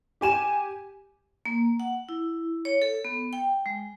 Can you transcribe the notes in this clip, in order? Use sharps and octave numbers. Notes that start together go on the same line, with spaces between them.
G4 G#5 E7
A#3
F#5
E4
C#5
A4
B3
G5
G#3